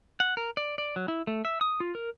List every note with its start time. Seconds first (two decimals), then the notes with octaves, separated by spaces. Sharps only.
0.20 F#5
0.37 A#4
0.57 D5
0.78 D5
0.96 F#3
1.08 E4
1.27 A3
1.45 E5
1.61 D#6
1.80 F4
1.95 A#4